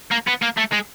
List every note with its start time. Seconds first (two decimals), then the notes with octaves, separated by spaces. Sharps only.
0.12 A#3
0.28 B3
0.42 A#3
0.58 A3
0.73 G#3